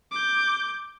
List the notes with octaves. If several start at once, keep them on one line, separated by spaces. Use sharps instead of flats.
D6 G6